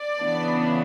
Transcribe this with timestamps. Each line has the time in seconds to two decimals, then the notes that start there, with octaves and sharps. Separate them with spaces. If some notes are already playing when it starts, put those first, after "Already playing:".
Already playing: D5
0.20 C#3 E3 B3 D4